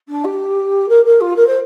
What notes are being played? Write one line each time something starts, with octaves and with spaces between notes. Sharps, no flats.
D4
G4
A#4
A#4
F4
A#4
C5